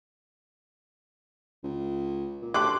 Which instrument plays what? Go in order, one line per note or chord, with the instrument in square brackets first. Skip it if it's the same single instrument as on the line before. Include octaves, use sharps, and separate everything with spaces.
[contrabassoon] C#2
A#2
[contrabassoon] D2 [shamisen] A3 G4 A4 [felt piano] C6 F#6 [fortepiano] D6